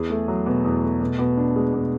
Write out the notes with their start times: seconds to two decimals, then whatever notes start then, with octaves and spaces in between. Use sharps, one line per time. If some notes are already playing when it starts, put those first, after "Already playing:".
Already playing: E2 G#4
0.10 A3
0.28 F#3
0.46 B2
0.64 E2
0.83 A3
1.01 B2
1.19 B2
1.37 D4
1.56 G#3
1.74 B2